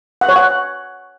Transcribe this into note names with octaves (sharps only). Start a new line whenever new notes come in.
F#5
C#5
F#5